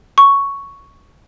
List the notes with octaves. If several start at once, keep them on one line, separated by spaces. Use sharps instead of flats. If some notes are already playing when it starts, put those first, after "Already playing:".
C#6